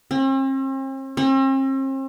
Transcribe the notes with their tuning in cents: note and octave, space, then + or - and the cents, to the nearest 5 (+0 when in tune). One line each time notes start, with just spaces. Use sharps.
C4 +45
C4 +45